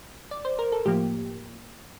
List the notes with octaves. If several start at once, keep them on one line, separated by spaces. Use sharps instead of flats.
D5
C5
A#4
A4
A2 F3 A#3 G4